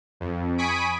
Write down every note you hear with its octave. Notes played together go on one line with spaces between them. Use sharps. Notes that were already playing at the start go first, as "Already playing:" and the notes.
F2
G#5 B5 C#6 D#6 B6 D7